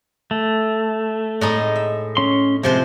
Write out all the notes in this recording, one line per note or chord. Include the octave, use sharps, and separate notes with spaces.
A3
A2 G#3 D#4
E5
C#4 C6
C3 F3 G#3 C5